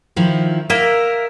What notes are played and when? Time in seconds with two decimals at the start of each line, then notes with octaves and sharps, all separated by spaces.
0.16 D#3 F3 E4
0.70 A#3 A#4 E5